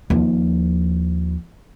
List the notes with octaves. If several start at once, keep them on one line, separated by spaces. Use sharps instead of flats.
D#2 F3